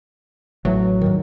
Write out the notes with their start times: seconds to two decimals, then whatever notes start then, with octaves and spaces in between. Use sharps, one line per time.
0.65 A1 E3 F#3 A3
1.01 D2 G#2 D#3